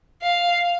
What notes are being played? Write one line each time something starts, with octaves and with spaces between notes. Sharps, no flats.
F5